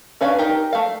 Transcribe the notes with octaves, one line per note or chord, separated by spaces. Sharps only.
C#4 D4 B4 C#5 F5
D#4 G4 A#4
A3 F5